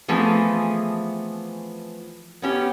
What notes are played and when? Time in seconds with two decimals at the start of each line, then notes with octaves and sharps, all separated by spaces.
0.08 E3 F3 A3 B3 C4 G#4
2.42 B3 C#4 G4